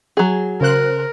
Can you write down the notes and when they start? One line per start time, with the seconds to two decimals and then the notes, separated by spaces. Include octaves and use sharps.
0.17 F#3 G#4
0.61 C#3 A#4 C5 F#6